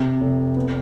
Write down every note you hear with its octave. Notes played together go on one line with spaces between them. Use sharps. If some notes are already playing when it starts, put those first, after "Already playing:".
Already playing: C3
F1
B3